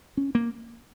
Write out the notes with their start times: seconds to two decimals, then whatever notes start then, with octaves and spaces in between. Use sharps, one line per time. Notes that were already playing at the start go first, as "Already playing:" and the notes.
0.17 C#4
0.35 A#3